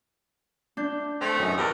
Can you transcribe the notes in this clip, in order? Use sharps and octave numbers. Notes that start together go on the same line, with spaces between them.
D4 G6
A3 C4
F#2 D#4
E2 G4 A#4 D5